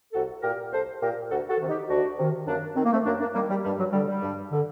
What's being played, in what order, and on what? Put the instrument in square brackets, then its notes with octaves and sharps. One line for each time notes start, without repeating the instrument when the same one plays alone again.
[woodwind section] C2 F#4 A4
A#2 G4 A#4
C2 A4 C5
A#2 G4 A#4
D2 F#4 A4
F#4 A4
C3 D#3
D#4 G4
D2 D4 F#4
C3 D#3
F#2 A#3 D4
D#3 C4
A#3
A3 C4
F#2 A#3 D4
A#3 D4
D#3 G3 A#3
G3
G2 G3
F#3
D3 G3
G3
G2
D3